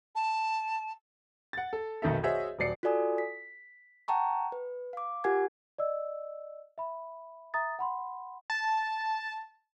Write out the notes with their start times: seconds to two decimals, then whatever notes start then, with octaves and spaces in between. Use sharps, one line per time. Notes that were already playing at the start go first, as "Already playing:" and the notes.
0.15 A5
1.53 F#5 A6
1.73 A4
2.02 F1 B1 D#3 D#4 A4 E5
2.23 F#4 G#4 C5 C#5 D#5 E5
2.59 D#1 F#3 D5 C7 C#7
2.83 F4 F#4 A4 D5 G#5 D#6
3.18 B6
4.08 F#5 G5 A5 A#5 C#6
4.52 B4
4.93 F5 D6
5.24 F4 G4 A#4 F#5 G#5 G#6
5.78 D5 D#5 E6
6.78 E5 B5
7.54 E5 A#5 D#6 A6
7.79 F#5 B5 C6
8.50 A5